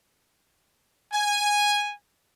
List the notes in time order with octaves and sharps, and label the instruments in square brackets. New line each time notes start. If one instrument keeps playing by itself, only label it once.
[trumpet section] G#5